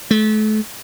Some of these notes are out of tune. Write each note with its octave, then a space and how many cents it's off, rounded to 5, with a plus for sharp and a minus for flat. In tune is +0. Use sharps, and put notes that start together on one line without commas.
A3 -35